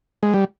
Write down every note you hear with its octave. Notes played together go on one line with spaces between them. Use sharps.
G#3
G3